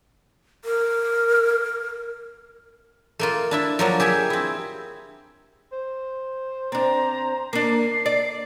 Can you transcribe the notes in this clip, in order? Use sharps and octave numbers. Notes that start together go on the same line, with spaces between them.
A#4
A3 A#3 F4
D4 E4 E5
F3 F#3 A#3 D4
G4 G#4 E5 G#5
C4 E4
C5
C4 D4 A#5
A#3 D4 C7
D5